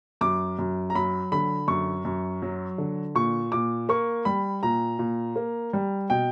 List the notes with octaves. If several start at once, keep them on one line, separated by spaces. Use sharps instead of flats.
F#2 D6
F#2
A#5
F#3 B5
D3 B5
F#2 C#6
F#2
F#3
D3
A#2 C#6
A#2 D6
A#3 C#6
G3 B5
A#2 A#5
A#2
A#3
G3
B2 G5